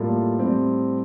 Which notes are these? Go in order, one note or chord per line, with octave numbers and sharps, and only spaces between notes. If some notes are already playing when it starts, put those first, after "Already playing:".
Already playing: A2 G3 A#3 F4 A4
A2 G3 C4